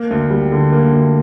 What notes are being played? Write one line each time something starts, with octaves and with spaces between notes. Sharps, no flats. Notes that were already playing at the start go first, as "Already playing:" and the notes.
Already playing: A#3
D2
G3
D3
A#3
D2